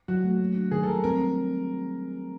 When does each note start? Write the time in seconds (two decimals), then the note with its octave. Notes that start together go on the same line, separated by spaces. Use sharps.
0.08 F#3 F#4
0.24 A3
0.39 A#3
0.56 D4
0.71 D#3 G#4
0.83 A4
0.87 G3 A#4
1.04 C4 A#4